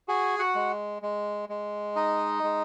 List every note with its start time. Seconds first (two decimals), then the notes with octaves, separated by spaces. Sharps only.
0.08 F#4 G#4 G#5
0.39 F#4 F#5
0.55 G#3
1.02 G#3
1.49 G#3
1.96 D#4 D#5
2.43 G#3